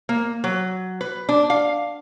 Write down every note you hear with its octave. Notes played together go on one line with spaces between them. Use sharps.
A#3
F#3
B4
D4
F5